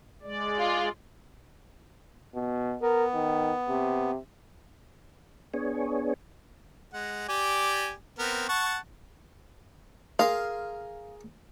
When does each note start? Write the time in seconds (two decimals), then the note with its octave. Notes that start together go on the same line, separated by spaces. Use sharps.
0.22 G#3 D5
0.59 F4
2.34 B2
2.81 B3 A#4
3.14 D#3
3.68 C3
5.54 B3 D4 G#4 C#5
6.94 G#3 F#5
7.29 G4 D5 G#5
8.19 B3 C4 A#4
8.49 F#5 A5 C#6
10.19 G#4 A#4 F5 C6